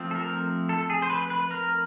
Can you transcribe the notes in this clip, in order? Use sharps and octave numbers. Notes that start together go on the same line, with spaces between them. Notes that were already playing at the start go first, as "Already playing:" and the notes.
Already playing: F3 A3 C4
A4
A#4
A4
G#4
C5
B4
B4
A#4